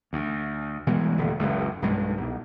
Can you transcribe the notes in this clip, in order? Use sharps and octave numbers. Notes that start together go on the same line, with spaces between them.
D2
B2 E3 G3 G#3
D#1 D2
F#1 C#2
B1 G2 G#3
C2 B2